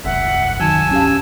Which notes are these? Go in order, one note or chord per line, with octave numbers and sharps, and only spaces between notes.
E1 C2 F#2 E5 F#5
D#3 F#3 G#5 A5 E6
C#4 G4 F5